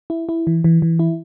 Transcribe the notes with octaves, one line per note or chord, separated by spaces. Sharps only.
E4
E4
E3
E3
E3
E4